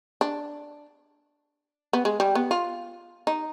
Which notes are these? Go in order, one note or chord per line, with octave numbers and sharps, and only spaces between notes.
D4
B3
G#3
G3
B3
F4
D#4